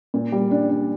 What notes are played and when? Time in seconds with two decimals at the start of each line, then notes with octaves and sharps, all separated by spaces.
0.14 A#2
0.32 G3
0.51 D4
0.69 D4